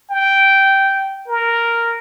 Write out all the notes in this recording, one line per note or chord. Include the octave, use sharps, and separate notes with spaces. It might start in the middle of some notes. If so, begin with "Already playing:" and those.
G5
A#4